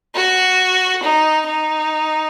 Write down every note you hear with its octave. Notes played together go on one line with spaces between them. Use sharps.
F#4
D#4
D#4